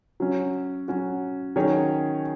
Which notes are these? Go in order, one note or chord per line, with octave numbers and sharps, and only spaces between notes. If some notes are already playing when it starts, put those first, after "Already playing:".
F#3 C#4 F#4
F#3 C#4 F#4
D#3 F#3 C#4 G#4 C#5